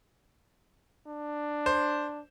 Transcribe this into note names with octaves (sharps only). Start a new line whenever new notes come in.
D4
C5